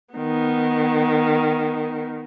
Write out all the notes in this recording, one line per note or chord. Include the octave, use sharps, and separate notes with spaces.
D#3 B3